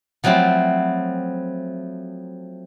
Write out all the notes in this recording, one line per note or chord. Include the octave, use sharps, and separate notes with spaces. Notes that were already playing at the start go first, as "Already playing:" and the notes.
F3 F#3 A3 C4 E4